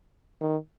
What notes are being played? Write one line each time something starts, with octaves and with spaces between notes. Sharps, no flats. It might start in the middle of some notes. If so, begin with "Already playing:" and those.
D#3